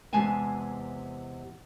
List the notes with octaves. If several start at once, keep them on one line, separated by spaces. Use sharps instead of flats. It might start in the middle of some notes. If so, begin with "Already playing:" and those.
E2 C3 G#3 B4 G#5 A5